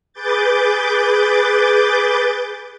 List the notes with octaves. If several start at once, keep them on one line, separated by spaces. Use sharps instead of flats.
G#4 B4 D6 G6 A6